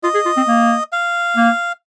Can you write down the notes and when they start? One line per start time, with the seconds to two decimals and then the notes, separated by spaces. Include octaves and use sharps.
0.03 F4 D#5
0.14 G#4
0.26 F4
0.37 C4
0.48 A#3
0.92 F5
1.36 A#3